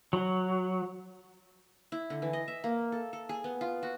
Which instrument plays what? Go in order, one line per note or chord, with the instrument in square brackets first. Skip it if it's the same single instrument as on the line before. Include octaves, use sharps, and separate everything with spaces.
[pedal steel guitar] F#3
[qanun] E4
D3
E3
D#5
E5
A#3
A4
A4
G#4
B3
F4
F#4